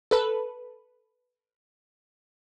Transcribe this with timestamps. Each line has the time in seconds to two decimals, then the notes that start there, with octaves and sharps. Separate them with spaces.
0.11 A4 B4